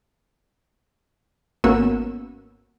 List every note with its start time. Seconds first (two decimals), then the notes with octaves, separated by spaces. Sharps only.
1.64 G#1 A#3 B3 C#4 F#4 E6